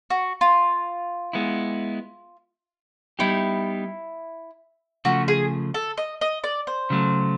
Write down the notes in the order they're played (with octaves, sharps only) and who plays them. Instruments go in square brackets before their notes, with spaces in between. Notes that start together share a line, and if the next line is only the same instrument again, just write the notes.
[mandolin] F#4
F4
[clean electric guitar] G#3 B3 E4
[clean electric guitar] G3 B3 D#4 G4 [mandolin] E4
[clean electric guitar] C#3 F3 A3 [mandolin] F#4
[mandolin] G#4
A4
D#5
D#5
D5
C5
[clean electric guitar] C#3 F#3 A3